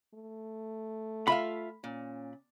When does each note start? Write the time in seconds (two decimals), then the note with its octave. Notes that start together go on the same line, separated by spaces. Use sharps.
0.14 A3
1.28 F4 E5 F5 B5
1.84 A#2 C#4